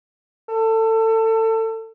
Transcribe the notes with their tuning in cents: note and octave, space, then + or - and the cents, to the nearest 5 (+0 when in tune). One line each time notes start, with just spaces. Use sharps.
A4 +25